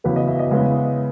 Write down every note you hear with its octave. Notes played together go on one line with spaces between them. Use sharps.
E2 C#3 F#3 B3 B4
D#5
E5
D#5
C#3 G#3 B3 E4